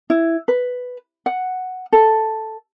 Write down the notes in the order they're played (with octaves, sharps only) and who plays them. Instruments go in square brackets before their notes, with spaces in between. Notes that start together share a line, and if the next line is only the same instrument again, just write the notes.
[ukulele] E4
B4
F#5
A4